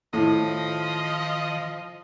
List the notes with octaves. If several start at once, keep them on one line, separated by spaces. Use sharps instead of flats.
A2 D#3 F3 D#5